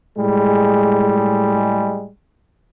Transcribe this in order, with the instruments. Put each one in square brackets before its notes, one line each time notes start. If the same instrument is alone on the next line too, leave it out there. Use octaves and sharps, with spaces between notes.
[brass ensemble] A2 G3 G#3